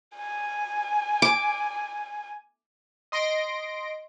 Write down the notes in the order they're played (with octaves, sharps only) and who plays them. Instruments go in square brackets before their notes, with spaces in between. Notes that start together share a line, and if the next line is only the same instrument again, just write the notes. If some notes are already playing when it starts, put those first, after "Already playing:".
[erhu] G#5
[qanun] D6
[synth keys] D#5 C6 A#6 D7